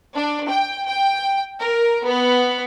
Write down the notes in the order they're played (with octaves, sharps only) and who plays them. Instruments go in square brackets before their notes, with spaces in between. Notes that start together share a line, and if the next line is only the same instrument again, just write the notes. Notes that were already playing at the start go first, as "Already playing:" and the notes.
[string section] D4
G5
G5
A#4
B3